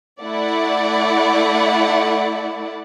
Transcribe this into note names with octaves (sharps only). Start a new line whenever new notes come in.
A3 E4 D5 F#5